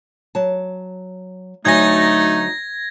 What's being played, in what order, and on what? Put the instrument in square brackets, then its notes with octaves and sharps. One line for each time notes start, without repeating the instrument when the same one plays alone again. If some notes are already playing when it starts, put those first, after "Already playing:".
[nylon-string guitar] F#3 A5
[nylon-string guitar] D2 F#3 G#5 [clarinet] A3 [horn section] D#4 [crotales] G#6 A#6